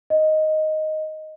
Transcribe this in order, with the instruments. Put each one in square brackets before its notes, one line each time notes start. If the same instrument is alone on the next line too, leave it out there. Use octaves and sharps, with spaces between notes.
[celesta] D#5